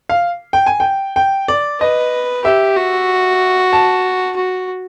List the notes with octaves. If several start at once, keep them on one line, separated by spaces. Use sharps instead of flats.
F5
G5
G#5
G5
G5
D5
B4 D#5
G4 E5
F#4
A5
F#4